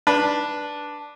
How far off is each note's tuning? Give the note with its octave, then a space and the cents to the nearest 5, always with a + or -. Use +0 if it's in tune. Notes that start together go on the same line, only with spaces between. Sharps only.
D4 +0 B4 -10